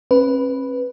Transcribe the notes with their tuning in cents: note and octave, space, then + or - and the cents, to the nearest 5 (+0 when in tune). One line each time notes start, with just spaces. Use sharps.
C#4 -45 B4 +0